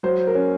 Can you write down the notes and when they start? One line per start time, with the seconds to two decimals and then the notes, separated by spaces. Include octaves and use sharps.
0.03 F#3 C5
0.27 A#4
0.35 C#4